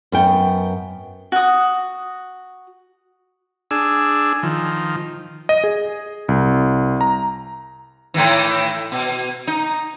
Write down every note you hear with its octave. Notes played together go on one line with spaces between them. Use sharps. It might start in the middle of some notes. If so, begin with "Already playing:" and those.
F#2 B3 G5
F#4 D#6
D4 G#4 E6
D#3 F3
D#5
G#4
C2
A#5
A2 D#3 E3
B2
D#4